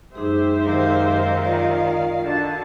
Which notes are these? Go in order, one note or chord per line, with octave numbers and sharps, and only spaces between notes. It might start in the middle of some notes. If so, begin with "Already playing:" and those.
F#2 G#3 D#4 G4 G#4 C5 E5
D#3 F5
F4 D5
D3 F#4 A5